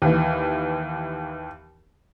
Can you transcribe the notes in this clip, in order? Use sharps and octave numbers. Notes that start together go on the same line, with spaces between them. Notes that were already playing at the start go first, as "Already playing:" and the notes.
D#2 E3